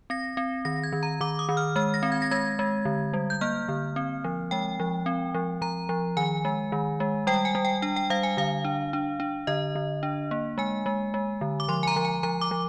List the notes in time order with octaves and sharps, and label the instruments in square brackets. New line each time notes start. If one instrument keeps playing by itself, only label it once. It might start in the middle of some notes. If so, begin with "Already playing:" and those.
[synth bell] C4 A#6
C4
D#3 A#6
G#6
D#3
A#5
D#3 D6
D#6
D#3
F6
G#3 F6
A#6
C4
G#6
A#6
G#3 G#6
G#3
D3
G3
G6
A#3 F6
D3
C4
F3
G#3 G5
F3
C4
F3
F3 A#5
F3
D#3 G#5
G#3
D#3
G#3
G3 G5
G#5
G3
G5
D4 G5
G5
G3 F5
G#5
D3 F5
D4
D4
D4
D3 D#5
D3
D4
A#3
G#3 G#5
G#3
G#3
D3
D6
F3 C6
G#5
A#5
F3
G#5
F3 A#5
D6
F3